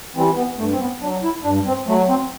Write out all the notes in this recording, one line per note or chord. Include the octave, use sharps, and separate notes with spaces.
E3 G3 C4
B3
G2 A3
C4
B3
F#3 D4
E4
G2 D4
C4
F#3 A3
C4